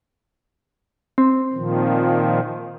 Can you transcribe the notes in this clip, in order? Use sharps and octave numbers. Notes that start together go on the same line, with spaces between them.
C4
A#2 D#3 F3